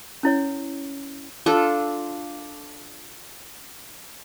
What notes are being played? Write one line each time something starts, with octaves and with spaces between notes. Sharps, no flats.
C#4 E4 C#5
D4 F4 A4